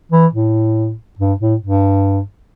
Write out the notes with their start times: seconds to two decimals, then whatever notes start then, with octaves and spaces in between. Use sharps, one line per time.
0.12 E3
0.33 A2
1.19 G2
1.40 A2
1.61 G2